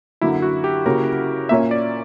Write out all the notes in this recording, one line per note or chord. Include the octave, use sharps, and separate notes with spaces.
F#2 D3 A#3 E4
F#4
G4
C#3 F#3 A#3 C#4 A#4
A#2 A#3 C#4 E5
D5